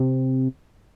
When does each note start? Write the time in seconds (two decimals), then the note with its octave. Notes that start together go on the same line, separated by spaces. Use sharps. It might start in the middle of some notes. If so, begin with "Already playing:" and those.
Already playing: C3